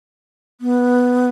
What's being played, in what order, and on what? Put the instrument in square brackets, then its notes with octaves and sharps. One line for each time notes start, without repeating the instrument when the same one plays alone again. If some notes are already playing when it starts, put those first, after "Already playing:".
[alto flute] B3